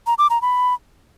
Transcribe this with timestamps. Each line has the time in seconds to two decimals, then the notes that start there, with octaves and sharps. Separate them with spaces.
0.07 A#5
0.18 D6
0.30 A#5
0.42 B5